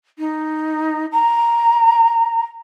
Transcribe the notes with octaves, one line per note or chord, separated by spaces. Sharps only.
D#4
A#5